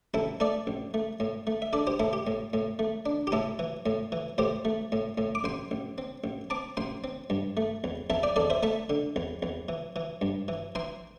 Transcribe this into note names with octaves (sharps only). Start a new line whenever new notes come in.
A1 E4 A4
A3 A4 D5
A1
A3
A2
A3
E5
D4 A4 D5
G4 C5
A2 E4 A4
G4
A2
A2
A3
D4
G4
A2 E4 A4
E3
A2
E3
A2 G4 C5
A3
A2
A2
D6
A1 G5 C6
A1
C4
A1
C4 A5 D6
A1 G5 C6
C4
G2
A3
E2
E2 E5 A5
D5 G5
E2 A4 D5
C5 E5
A3 E5 A5
D3
E2
E2
E3
E3
G2
E3
E3 G5 C6